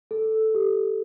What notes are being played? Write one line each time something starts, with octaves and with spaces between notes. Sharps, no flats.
A4
G4